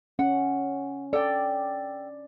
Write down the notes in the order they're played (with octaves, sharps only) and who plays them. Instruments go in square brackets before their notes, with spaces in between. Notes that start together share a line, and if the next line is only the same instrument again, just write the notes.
[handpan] C#4 [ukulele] F#5
[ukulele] A4 G5 [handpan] D5